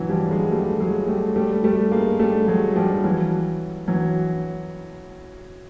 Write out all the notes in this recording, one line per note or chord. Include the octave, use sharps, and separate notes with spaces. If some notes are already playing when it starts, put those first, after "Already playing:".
Already playing: E3 F#3
F3 G3
F#3 G#3
G3 A3
F#3 G#3
G3 A3
G3 A3
G3 A3
G#3 A#3
G3 A3
F#3 G#3
F3 G3
E3 F#3
E3 F#3